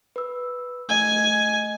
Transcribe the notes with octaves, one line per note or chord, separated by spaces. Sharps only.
B4 E6
A3 D#5 G#5